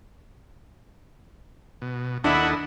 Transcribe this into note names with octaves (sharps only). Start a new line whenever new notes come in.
B2
D#2 D4 E4 A4 D#5 F#5